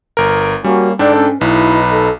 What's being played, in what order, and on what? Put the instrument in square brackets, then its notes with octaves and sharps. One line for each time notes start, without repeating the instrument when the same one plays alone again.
[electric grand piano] G1 A#4
[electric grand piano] G3 [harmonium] A#3 C#4 [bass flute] F#4
[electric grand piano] G#2 D4 [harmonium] A4 G5 [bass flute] D5
[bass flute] C#4
[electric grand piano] B1 [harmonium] D#4 B4 [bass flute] E4
[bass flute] A4